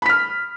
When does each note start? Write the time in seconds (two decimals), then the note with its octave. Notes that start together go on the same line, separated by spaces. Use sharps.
0.02 B5
0.06 B6
0.09 F6